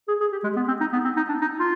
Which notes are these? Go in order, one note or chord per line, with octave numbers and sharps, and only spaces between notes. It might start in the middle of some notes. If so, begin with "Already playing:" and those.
G#4
G#4
G4
G#3
B3
C4
D#4
B3
C4
D#4
D4
D#4
F4